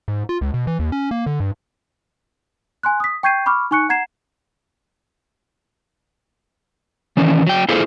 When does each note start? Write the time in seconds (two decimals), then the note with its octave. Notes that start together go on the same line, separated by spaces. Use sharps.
0.08 G#2
0.29 F4
0.41 C#2
0.54 B2
0.67 E3
0.79 D#2
0.92 C#4
1.11 A#3
1.26 D3
1.40 G2
2.83 G#5 C6 F#6
3.00 D#6 B6
3.23 G5 C#6 G6 G#6 C7 D#7
3.46 B5 C#6 D6 F6
3.71 D#4 G#5 C#6 F#6 C#7
3.89 F#5 A#5 G#6 C7 E7
7.17 D#3 E3 C#4
7.47 F#3 G5
7.69 E4 F4 G#4 A4 C5